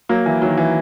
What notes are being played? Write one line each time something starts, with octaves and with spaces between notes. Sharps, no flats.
F#3 A#3
E3
D#3 F#3
E3